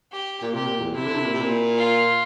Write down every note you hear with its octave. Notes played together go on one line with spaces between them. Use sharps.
G4
A#2
C3 G4
A#2
E2
C3 E4
D3
C3
A#2
C3
A#2
F4